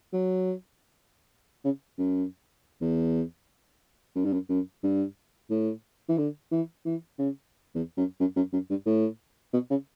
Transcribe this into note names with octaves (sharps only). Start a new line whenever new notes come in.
F#3
C#3
F#2
E2
F#2
G2
F#2
F#2
G2
A2
E3
D3
E3
E3
C#3
E2
F#2
F#2
F#2
F#2
G2
A2
B2
C#3